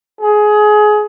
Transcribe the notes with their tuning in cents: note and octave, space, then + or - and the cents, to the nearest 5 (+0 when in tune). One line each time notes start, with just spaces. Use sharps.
G#4 +20